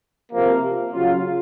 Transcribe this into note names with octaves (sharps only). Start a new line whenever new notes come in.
C3 F3 A#3
C#3 F#3 C#4 F4